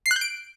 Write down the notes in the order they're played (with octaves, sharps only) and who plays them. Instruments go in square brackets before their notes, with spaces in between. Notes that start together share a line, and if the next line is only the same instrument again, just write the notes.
[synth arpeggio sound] C7
F#6
G6
D7